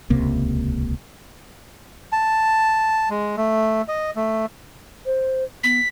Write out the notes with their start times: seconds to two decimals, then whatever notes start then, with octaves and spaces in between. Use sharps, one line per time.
0.10 D#1 C#2 C3 A#3
2.12 A5
3.10 G#3
3.37 A3
3.88 D#5
4.16 A3
5.06 C5
5.63 B3 B6